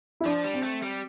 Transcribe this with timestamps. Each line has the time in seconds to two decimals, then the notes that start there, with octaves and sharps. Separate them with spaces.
0.20 E4
0.25 F3 D4
0.44 G3
0.54 C4
0.63 A3
0.83 G3